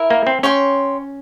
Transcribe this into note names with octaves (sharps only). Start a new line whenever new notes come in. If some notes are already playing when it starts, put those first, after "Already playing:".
Already playing: E4 A#4 E5
A#3
C4
C#4 C#5 G5 C6